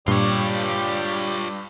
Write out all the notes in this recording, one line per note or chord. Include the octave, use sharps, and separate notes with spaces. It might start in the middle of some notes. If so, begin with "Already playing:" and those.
G2 A#2 G3 F4 G4 C#5 D5